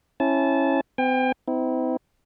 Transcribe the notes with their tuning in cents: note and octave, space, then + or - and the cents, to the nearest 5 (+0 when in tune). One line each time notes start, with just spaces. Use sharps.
C#4 -25 E4 +0 A5 -20
C4 -40 G5 +35
C4 -35 E4 -35